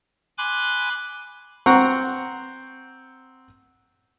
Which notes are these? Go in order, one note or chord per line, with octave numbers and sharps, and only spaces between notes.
G#5 B5 C6 D6 F#6
C4 F#5 A#5 C#6